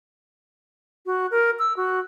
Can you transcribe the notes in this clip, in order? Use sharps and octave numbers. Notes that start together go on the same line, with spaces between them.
F#4
A#4
E6
F#4